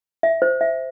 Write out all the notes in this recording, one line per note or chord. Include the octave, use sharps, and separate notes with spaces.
E5
C5
E5